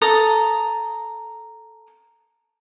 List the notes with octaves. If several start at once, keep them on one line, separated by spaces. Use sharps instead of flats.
A4 A#5 D#6